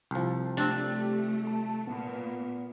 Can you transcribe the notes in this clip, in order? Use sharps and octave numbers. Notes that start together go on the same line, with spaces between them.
C2 F3
A3 C4 D4 G4
A5
A#2 B3